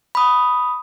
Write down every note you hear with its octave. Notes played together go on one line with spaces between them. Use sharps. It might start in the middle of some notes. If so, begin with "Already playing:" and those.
B5 D#6